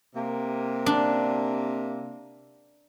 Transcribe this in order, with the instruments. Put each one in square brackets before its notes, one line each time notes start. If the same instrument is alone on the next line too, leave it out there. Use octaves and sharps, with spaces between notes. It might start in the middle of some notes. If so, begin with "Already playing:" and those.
[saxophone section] C3 A#3
[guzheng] D4